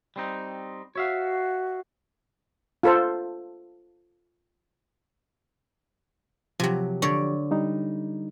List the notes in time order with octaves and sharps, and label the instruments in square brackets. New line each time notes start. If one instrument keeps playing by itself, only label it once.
[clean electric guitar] G3 C4 D#4
[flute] F#4 [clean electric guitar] C#5 E5 F5
[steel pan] F4 A4 C5
[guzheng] C3 F#3 [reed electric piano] F3 G4
[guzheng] D3 C#5 D5
[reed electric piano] G3 D#4